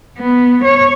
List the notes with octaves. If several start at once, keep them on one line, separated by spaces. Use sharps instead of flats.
B3
C#5